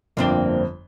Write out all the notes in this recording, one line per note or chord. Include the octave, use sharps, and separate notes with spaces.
G1 F2 A#3 C4 D4 G7